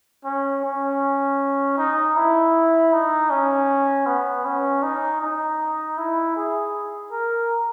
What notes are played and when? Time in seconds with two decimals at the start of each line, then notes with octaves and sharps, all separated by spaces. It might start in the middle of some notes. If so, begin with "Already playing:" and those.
0.25 C#4
0.64 C#4
1.78 D#4
2.16 E4
2.93 D#4
3.30 C#4
4.06 B3
4.46 C#4
4.83 D#4
5.21 D#4
5.98 E4
6.36 G#4
7.12 A#4